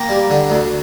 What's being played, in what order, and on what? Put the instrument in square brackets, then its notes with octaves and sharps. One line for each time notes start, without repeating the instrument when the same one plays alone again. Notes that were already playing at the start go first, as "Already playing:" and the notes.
Already playing: [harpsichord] A#3 G5 A#5
G3
D3
D2